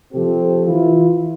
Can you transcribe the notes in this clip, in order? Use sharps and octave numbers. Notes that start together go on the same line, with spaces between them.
C3 F3 A3 C4 G4 A4
E3 E4 F4